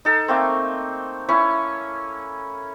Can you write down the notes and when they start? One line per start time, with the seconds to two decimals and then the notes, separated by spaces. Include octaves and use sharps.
0.05 D#4 A4
0.28 A3 A#3 C4
1.29 C#4 E4 C#5